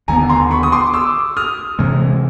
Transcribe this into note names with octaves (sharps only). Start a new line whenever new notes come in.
D#2 D3 F#3 B3 G#5 A#5
A#5 C6
B5 C#6
D#6
C6 D6
D6 E6
D#6 F6
C3 E3 G#3